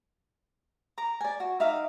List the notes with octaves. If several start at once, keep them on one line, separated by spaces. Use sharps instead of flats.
A#5 D6
D5 G#5
F#4
D#4 E5 F5 D6